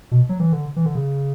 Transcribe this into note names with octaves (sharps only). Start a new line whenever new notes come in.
B2
F#3
E3
D3
E3
D3
C#3